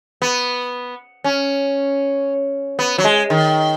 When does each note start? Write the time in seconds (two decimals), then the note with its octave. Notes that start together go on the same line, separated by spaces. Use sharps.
0.22 B3
1.24 C#4
2.79 B3
2.98 F#3
3.04 G#3
3.30 D#3